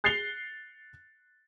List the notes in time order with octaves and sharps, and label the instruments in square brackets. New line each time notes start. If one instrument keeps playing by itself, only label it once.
[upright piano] F#6 A6 C7 C#7 F7 G7